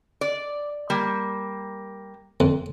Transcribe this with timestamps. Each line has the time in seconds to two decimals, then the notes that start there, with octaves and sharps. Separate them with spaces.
0.21 D5
0.90 G3 A#3
2.40 F2